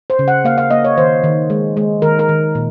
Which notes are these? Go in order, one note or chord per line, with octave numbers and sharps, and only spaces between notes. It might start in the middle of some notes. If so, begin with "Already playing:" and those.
C5
C#3
F#5
A#3 F5
F5
A#3 D#5
C#5
D#3 C5
D#3
G#3
G#3
D#3 A#4
A#4
D#3
A#2